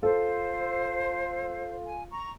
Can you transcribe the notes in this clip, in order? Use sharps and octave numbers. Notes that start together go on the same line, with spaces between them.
F4 A4 C5
G#5
A#5 C#6